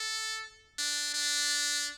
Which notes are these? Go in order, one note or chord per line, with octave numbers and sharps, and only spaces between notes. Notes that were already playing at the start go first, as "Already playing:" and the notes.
Already playing: A4
D4
D4